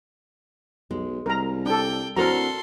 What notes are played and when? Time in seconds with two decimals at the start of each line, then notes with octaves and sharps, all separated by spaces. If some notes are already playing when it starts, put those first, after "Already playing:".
0.91 B1 G#3
1.26 C2 A#4 A#5
1.66 D4 A4 G5
2.16 A2 C4 D4 F#4 A4 A#4 A#5 C6